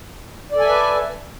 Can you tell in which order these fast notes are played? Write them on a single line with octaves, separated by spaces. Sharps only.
D5 A4 G#5 E5 B4